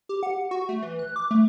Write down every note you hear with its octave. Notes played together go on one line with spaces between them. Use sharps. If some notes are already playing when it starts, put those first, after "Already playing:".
G4
F#5
F#4
A3
E3
F#6
D6
A3